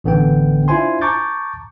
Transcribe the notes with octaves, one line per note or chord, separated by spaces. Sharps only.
A1 D3 B3 G5
D4 E4 F4 C5 G#5 C6
A5 A#5 C#6 D6 G6 A6